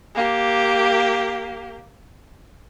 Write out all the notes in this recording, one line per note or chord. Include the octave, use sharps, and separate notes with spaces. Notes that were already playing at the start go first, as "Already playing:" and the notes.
A#3 G4